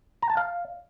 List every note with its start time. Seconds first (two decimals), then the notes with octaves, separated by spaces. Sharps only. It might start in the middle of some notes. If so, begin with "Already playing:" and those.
0.22 A#5
0.30 A5
0.37 F5